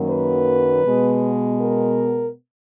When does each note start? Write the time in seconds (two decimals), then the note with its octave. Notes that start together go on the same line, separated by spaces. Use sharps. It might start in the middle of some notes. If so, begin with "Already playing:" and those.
Already playing: F#2 D#3 F#3 A#3
0.10 B4
0.85 B2 G#3 B3
1.61 A#4